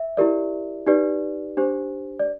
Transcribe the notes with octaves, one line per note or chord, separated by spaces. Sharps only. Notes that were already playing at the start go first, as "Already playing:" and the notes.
Already playing: E5
E4 G4 A#4 D5
D#4 G4 B4 D5
D4 G4 C5
D5